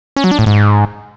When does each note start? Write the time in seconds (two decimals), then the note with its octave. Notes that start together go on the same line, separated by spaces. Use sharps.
0.16 C#4
0.24 F#3
0.31 D4
0.39 A2
0.46 G#2